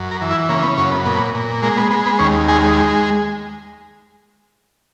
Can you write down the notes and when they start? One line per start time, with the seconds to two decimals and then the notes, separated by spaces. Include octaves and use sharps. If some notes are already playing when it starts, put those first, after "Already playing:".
Already playing: F#2
0.11 A#4
0.21 E3
0.30 E4
0.49 C#3 A#3
0.63 B3
0.77 F#2 C#4
0.92 B3
1.05 A#2 B3
1.35 A#2
1.62 G#3 A#3
1.77 B3
1.91 G#3 B3
2.06 B3
2.19 D#2 C#4
2.48 G#3 G#4